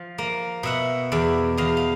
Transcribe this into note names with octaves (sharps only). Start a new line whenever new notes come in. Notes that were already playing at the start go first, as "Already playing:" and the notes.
Already playing: F3 F5
A#3
B2 E5 F#5
E2 D5 E5
E2 D#5 F5
F5